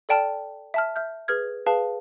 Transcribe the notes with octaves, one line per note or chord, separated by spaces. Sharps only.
A4 D5 G5 A5 F6
E5 A5 F6
E5 F6 G6
G#4 B4 F6 G#6
G#4 B4 F5 A5